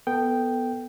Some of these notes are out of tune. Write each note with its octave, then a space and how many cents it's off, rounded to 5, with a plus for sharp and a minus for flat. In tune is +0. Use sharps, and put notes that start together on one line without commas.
B3 +0 A4 +15 G5 +0